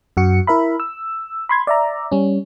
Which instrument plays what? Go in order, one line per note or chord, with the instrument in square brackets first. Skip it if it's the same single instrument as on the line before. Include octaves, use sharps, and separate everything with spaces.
[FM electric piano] F#2 F#4 C#7
E4 A#4 E5 B5
E6
B5 C6 G#6
D5 E5 A#5
G3 C#4